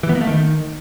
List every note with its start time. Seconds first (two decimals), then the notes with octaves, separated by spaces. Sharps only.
0.03 E3
0.09 B3
0.15 A#3
0.21 A3
0.27 D#3